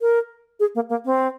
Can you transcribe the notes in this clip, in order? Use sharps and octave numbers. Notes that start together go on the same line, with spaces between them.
A#4
G#4
A#3
A#3
C4